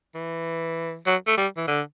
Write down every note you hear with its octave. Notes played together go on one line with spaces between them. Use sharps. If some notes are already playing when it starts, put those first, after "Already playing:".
E3
F#3
A3
G3
E3
D3